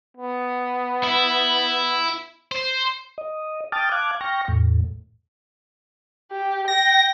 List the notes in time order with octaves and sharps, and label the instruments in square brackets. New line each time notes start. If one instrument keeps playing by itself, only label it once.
[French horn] B3
[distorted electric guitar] E4
C5
[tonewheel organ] D#5
G5 A5 D6 D#6 F6 A6
F5 A5 D6 F#6 G#6
G5 C#6 F6 A#6
E2 A2
[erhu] G4
[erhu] G5 [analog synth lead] A#6